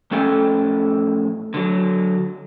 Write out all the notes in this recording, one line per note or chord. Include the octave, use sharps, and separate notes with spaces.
F2 A2 C#4 A4 G5 G#5
D3 F#3